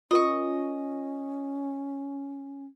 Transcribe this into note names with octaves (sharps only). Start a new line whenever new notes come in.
C#4 F4 A#4 D#5 C#6